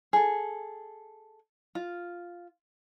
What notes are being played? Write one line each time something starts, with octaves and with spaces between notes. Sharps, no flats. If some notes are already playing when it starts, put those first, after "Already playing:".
G#4 A4
F4